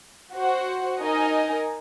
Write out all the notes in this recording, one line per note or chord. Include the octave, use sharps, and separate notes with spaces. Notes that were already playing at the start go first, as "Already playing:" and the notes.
F#4 C5 F#5
D#4 A#4 D#5 G#5